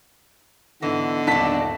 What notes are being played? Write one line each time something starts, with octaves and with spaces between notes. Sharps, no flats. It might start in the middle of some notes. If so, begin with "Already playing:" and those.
G#2 D3 E3 B3 D#5
D#1 F#3 D4 A5 B6